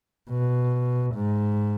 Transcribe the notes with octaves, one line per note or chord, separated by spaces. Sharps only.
B2
G#2